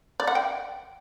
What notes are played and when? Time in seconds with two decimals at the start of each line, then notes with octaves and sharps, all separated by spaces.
0.20 D5
0.27 F#5
0.35 G5